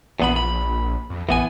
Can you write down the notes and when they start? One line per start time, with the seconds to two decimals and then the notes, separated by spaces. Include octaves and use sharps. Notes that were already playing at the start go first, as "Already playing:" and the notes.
0.19 A#1 E2 B3 B5
0.36 B5
1.10 F2
1.29 A1 E3 B3 G#5